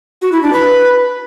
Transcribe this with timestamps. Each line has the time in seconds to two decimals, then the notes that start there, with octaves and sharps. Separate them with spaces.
0.22 F#4
0.32 E4
0.43 D4
0.53 B4